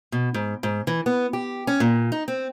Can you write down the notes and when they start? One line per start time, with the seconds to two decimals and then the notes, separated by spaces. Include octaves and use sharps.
0.12 B2
0.34 G#2
0.63 G#2
0.87 E3
1.06 B3
1.33 G4
1.67 C#4
1.80 A#2
2.12 D#4
2.28 C4